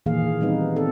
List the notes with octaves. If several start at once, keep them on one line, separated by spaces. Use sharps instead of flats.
A#2 D#3 E3 A#3 G#4 F5
G3 B3 C4 D#4 B4
C4 A4 D5